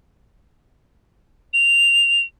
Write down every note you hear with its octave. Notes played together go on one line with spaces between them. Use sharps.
F7